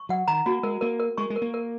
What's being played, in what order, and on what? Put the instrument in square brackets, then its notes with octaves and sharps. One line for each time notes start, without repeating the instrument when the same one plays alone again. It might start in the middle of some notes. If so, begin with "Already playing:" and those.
Already playing: [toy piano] C#6
[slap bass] F#3 [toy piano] F#5
[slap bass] D#3 [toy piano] A#5
[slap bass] A#3 [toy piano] F#4
[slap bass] G#3 [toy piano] A#4
[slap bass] A#3 [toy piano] A#4
[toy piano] A#4
[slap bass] G#3 [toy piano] C#6
[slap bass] G#3
[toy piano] A#4
[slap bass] A#3
[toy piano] A#4